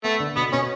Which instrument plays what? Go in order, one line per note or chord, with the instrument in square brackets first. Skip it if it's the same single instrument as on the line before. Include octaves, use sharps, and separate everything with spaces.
[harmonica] A3 [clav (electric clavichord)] B3
[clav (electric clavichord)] D3
[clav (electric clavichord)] B2 [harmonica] B3
[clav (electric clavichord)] B2 [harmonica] C#4